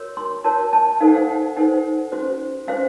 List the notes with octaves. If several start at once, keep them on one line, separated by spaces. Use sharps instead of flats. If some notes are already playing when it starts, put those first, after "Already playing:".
Already playing: F#4 A#4 C#5
C6
F#4 A#4 C#5 A5
A5
D#4 A4 C5 F5
F#5
F5
D#4 A4 C5 F#5
C#4 F#4 C5
C#4 F#4 C5 F5